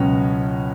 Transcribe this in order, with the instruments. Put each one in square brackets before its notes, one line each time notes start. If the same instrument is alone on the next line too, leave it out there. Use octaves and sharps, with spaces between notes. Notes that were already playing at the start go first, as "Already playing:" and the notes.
Already playing: [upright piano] C#2 B2 F#3 C#4